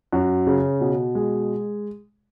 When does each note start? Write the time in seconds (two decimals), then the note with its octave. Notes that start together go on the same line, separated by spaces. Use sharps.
0.13 F#2 F#4
0.47 C#3
0.81 B2
1.15 G#3